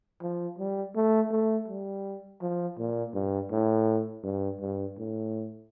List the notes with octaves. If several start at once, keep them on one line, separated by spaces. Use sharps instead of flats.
F3
G3
A3
A3
G3
F3
A#2
G2
A2
G2
G2
A2